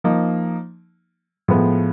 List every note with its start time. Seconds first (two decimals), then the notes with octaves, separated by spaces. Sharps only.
0.04 F3 A#3 D#4
1.48 A2 F3 G#3 B3